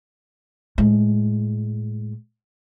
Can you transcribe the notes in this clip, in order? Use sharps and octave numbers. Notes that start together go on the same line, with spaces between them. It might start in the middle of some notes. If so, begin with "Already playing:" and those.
A2 G#3